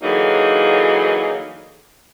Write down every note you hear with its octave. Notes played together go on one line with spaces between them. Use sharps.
D3 E3 F#3 A#3 D#4 G#4